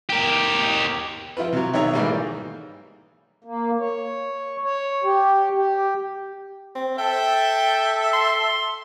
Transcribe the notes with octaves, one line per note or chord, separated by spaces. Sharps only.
G4 A#4
F3 E4 F4 B4
C3 F#3
B1 D#3 C#5 E5 A#5
G#2 E3 G3 A3 A#3
A#3
C#5
C#5
G4
G4
C4
A4 E5 G5 A5
C6